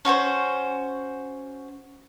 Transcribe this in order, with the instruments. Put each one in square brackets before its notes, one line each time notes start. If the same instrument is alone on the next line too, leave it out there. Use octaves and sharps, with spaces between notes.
[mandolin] C#4 F#4 A4 C5